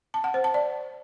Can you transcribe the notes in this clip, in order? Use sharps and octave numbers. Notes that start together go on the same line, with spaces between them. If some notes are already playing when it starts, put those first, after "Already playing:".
A5
F#5
C5
A5
D5